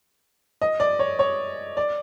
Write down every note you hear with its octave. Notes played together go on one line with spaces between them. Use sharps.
D#5
D5
C#5
C#5
D5